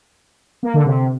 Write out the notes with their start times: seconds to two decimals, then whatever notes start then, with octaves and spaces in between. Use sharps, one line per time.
0.63 A#3
0.74 D3
0.85 C3